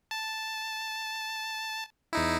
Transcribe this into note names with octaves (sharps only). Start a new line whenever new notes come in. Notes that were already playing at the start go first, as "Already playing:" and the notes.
A5
E2 D#4 E4